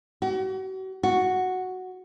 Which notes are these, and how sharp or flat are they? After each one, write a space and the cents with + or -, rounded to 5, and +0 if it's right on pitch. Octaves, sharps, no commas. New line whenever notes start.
F#4 +40
F#4 +0